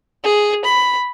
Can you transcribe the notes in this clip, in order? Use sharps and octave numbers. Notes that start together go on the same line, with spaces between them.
G#4
B5